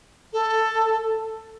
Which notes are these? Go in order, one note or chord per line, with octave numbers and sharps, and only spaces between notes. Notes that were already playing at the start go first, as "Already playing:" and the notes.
A4